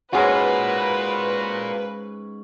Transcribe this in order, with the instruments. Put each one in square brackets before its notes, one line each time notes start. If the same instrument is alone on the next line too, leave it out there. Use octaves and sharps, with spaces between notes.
[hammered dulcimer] G#2 C#4 [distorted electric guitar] F4 A#4 [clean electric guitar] F#4 G#4 [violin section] B4